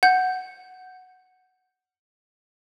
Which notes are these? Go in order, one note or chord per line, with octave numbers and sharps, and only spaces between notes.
F#5 G6